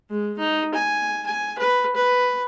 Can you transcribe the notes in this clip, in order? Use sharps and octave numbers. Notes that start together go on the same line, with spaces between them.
G#3
D#4
G#5
G#5
B4
B4